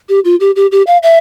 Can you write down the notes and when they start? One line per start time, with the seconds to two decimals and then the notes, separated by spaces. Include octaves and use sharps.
0.09 G4
0.25 F4
0.40 G4
0.56 G4
0.72 G4
0.87 F5
1.03 E5